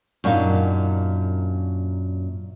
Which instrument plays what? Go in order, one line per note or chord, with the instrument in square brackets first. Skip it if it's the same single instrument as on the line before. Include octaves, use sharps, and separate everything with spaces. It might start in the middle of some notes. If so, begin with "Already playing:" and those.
[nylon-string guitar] F#2 A#2 D4 D#4 F5